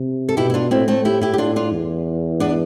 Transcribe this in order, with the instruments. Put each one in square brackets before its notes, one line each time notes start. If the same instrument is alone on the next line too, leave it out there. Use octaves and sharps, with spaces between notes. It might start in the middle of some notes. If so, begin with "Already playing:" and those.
Already playing: [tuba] C3
[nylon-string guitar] A4
[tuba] B2 [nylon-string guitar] E4 G4
[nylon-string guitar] E4
D4 F4
[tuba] A2 [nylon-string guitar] C4 E4
[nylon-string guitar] A3 C4
E4 G4
E4 G4
G4
D4 F4
D4 F4
[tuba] E2
[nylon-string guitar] B3 D4